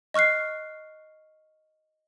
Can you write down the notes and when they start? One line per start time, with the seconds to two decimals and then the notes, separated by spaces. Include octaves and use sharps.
0.14 D#5 C#6 F6 F#6 C7